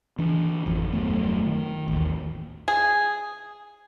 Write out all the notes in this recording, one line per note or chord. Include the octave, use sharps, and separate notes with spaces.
E3 D4
G#1 F2
D#1 F#2 A3 B3
D#3
A1 D#2
G#4